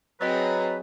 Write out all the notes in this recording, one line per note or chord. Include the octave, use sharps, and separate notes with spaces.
F#3 C4 G#4 B4 C#5 D#5 A6